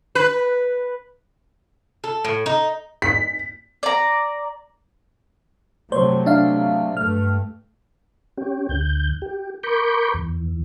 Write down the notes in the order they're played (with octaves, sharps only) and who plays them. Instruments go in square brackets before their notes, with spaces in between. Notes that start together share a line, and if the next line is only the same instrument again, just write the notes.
[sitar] B4
[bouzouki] A4
A2
D#4
[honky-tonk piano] B6
[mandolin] D5 A#5
[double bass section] C3 F#3 A3 [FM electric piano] C5 C#5
[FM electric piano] D4 E5 F5
[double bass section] G2 A3 [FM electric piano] F6
[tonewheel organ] C#4 G4
D2 G6
G4
A#4 B5 C#6 D6 G6
E2